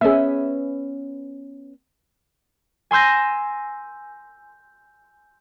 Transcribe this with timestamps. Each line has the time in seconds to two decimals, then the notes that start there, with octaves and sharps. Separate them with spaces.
0.01 B3 C#4 G#4 E5
2.91 G#5 C6 E6 G6 A#6